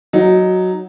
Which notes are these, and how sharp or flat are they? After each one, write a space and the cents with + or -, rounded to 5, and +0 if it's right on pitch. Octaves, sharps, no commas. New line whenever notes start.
F#3 +0 D#4 +0